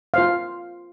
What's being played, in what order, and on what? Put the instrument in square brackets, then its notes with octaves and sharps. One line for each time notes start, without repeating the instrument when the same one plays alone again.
[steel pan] F4 C5 F5